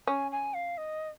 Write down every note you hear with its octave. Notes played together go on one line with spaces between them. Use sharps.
C#4 G#5
G#5
F5
D#5